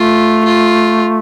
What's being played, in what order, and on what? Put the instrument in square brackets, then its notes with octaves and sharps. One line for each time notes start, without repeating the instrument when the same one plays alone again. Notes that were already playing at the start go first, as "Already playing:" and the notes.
Already playing: [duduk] A3 [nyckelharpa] F4
[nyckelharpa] F4